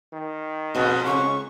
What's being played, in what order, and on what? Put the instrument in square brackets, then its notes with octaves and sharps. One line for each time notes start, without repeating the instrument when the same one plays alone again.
[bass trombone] D#3
[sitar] F2 G#2 [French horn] B2 [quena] D#5
[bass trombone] C#2 [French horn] C#3 [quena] C#6